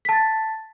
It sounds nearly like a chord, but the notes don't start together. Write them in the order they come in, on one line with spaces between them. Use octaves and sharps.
B6 A5 A6